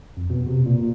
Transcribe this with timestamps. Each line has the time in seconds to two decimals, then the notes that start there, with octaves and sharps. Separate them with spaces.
0.17 F2
0.30 B2
0.47 C3
0.66 A#2